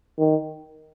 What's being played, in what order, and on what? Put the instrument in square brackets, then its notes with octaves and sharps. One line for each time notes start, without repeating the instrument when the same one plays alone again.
[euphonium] D#3